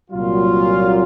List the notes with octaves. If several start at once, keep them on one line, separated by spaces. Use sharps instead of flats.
C2 A#2 F#3 F4